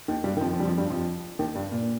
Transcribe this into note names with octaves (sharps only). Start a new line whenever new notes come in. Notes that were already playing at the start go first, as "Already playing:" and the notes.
D#2 D#3
G2 G3
D#3
F2 F3
F2 F3
G3
F2 F3
G2 G3
F2 F3
D#2 D#3
G2
A#2